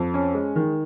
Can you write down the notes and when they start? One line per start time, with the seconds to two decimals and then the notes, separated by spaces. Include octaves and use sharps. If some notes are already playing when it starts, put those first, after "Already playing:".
Already playing: F2
0.14 C#4
0.34 G#3
0.56 D#3